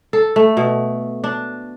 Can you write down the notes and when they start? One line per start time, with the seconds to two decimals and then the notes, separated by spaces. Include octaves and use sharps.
0.13 A4
0.36 A3
0.57 B2
1.24 D4